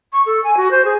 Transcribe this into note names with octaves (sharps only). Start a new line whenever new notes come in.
C#6
A4
G#5
F#4
C5
G#4